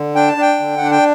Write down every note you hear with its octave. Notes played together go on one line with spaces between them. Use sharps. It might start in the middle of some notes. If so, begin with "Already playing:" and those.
Already playing: D3
D4 G5
A5
D4 G5
D3
D4 F#5
G5